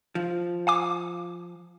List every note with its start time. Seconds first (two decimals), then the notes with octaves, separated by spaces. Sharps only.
0.15 F3
0.67 F5 G#5 D6